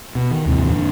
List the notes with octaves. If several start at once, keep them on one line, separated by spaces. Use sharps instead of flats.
B2
D#3
D#2 G#2 C3 E3
F2 A#2 D3 D4